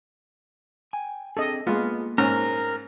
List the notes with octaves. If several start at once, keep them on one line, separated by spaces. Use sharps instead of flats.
G5 G#5
C4 D4 G#4 A4 D#5
G#3 A#3 B3 F4
G#2 C#4 A#4